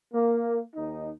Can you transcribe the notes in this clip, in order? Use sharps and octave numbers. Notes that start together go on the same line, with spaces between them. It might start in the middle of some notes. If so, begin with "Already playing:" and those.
A#3
D#2 D#4